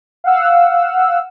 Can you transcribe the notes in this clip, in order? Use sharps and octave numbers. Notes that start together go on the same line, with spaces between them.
F5 F#5 E6